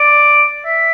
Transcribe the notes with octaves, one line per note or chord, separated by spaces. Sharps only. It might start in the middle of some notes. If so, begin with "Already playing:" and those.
Already playing: D5
E5